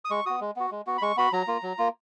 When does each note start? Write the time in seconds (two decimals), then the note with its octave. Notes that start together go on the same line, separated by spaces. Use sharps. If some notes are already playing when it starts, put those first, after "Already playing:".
0.05 D#6
0.10 G#3 C#6
0.26 B3 F#4 D#6
0.41 G#3
0.56 B3 F#4
0.71 G#3
0.87 B3 F#4
0.98 B5
1.02 G#3 C#6
1.17 B3 F#4 B5
1.32 F#3 A#5
1.48 A#3 F4
1.63 F#3
1.78 A#3 F4